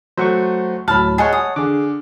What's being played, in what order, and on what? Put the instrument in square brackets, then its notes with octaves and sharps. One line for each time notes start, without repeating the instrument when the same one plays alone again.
[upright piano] F#3 A3 [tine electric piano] C5 F#5 C#6
[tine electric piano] D2 A2 F#3 [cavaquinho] A5 [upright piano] B5 F6
[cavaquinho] G#4 D#5 G#5 [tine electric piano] C#5 F#5 A5
[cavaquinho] D#6
[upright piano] D3 [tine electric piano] G#4 D6